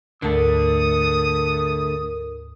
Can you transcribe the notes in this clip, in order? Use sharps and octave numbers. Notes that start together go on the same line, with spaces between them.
D2 G#2 D3 A3 D4 A#4 A5 D#6